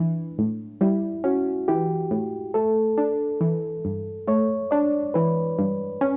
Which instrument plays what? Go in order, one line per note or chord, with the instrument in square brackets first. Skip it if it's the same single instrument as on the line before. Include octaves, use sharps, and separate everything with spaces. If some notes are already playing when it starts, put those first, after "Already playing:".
Already playing: [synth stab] E3 [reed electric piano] D4
[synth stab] A2
[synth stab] G3 [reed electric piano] E4
[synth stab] C#4 [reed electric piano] F#4
[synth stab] E3 [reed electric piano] G4
[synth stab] A2
[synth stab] A3 [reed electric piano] A4
[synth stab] D4
E3
G2
[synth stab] A3 [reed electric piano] C#5
[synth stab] D4 [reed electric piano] D5
[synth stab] E3 [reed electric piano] B4
[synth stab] G2
C#4